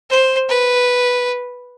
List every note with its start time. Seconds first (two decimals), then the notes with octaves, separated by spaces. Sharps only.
0.10 C5
0.49 B4